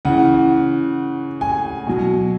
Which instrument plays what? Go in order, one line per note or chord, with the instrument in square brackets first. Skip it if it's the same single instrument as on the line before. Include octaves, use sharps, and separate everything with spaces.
[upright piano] C#3 E3 F#5
G#5
B2 F#3